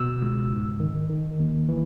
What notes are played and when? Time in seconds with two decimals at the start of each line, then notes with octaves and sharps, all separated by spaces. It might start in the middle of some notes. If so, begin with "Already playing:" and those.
Already playing: B2 E6
0.22 C#2
0.51 G#2
0.80 D#3
1.10 D#3
1.39 D#2
1.69 E3